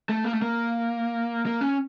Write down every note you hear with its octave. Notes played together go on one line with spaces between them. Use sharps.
A3
A#3
A3
A#3
A#3
C#4